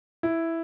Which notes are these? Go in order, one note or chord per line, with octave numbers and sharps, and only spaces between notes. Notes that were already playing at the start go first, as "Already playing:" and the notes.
E4